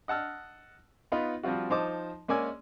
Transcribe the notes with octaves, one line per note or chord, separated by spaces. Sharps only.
D#5 F#5 A5 E6 F6
B3 D#4 F4 B4
F3 G3 C4 F4 F#4
F3 D#4 C5 A5 D6 D#6
G#3 A#3 C#4 D5 G#5 E6